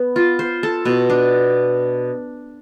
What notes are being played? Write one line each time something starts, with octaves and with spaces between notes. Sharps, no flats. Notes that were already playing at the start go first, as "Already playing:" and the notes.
Already playing: B3
F4
C5
A4
B2
D4